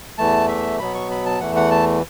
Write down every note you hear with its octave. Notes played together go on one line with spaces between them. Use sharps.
E2 E3 A3 A5
E5
B2 F#3 B3 B5
C#6
B5
A5
E2 E3 A3 F#5
F#5
A5